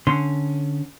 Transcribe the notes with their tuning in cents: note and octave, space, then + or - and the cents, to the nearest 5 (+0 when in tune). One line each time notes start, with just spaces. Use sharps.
D3 +0 C#4 +0 C6 -5